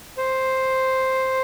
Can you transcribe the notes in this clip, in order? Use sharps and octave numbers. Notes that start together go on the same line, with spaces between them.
C5